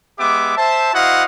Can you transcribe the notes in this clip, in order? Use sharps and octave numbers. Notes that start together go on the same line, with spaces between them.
G#3 B3 G4 E5 D6
C5 E5 A5
E4 F#4 C5 D#5 F5 F#5